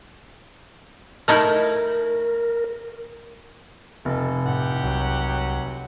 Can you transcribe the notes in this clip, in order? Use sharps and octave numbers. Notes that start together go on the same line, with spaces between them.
A3 D#4 E4 A#4
F1 A4
A2 G4 F#5
C2 F#3